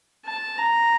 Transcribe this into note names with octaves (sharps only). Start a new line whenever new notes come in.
A5
A#5